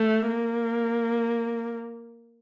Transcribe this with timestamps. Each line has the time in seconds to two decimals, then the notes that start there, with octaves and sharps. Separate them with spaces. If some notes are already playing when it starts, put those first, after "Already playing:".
Already playing: A3
0.30 A#3